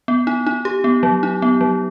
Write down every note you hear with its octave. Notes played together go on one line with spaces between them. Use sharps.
B3
D#4
D#4
G4
B3
F#3
D#4
B3
F#3